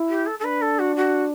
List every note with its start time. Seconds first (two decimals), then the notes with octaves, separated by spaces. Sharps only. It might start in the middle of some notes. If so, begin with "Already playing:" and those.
Already playing: E4
0.09 G4
0.26 A4
0.39 A4
0.44 D4 B4
0.61 A4
0.79 F#4
0.96 F#4